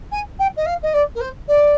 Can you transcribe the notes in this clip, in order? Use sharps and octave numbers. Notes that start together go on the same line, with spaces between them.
G#5
G5
D#5
F5
D#5
D5
A#4
C5
D5